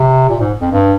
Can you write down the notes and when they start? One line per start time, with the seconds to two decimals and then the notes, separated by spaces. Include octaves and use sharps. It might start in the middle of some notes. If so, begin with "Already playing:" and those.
Already playing: C3
0.29 A#2
0.41 G#2
0.61 F2
0.72 G2